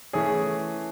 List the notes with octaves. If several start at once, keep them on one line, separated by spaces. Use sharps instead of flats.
E3 A3 C#4 G#4